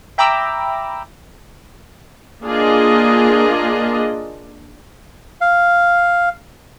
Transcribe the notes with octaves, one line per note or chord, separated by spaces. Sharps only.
E5 G5 A#5 B5 D6 E6
A#3 D4 F4 G#4 D#5
F5